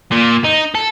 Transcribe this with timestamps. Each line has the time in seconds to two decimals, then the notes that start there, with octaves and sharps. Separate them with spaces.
0.11 A#2
0.44 D#4
0.75 A4